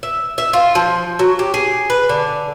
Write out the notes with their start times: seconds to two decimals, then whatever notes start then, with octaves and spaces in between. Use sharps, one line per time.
0.03 E5
0.38 E5
0.53 F4
0.75 F3
1.19 F#3
1.39 G4
1.54 G#4
1.90 B4
2.09 D3